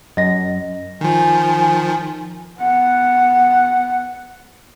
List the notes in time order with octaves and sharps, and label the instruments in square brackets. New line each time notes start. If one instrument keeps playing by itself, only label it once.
[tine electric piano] F#2 [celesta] D#5 A#6
[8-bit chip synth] D#3 F3 [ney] G#5
[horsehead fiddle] B3 F#5